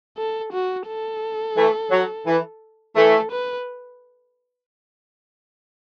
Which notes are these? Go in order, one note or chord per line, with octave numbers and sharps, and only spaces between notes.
A4
F#4
A4
E3 A3
F#3
E3
E3 A3 A4
B4